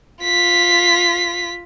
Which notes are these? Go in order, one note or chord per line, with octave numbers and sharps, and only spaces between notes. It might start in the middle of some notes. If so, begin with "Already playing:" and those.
F4 B6